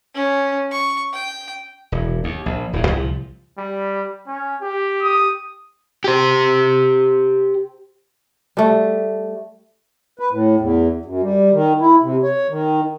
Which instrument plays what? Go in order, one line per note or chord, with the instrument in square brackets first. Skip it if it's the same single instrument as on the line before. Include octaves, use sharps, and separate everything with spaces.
[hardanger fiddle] C#4
C#6
G5
[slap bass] E1
D#2
A#1
D#1 A2 D#3
C2 A#2 F3
[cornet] G3
C#4
G4
[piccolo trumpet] D#6
[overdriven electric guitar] G4 C5
[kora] G3 A3
[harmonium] B4
A2
E2
F#2
G3
D#3
E4
C3
C#5
D#3